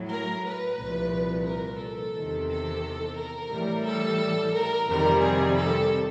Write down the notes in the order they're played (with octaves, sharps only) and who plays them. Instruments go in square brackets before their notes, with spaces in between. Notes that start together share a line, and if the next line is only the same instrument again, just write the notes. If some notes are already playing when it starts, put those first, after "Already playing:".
Already playing: [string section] A2 F#3
A#4
B4
C2 A#2 F3
A#4
A4
E2 C3 D#3
A4
A#4
A2 E3 G3
A4
A#4
F2 C3 D#3 G3 A#4
G#4
A4